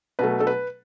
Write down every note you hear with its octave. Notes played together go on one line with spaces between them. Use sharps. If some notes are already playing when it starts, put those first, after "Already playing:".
B2 F#3 A3 B4
A4
B4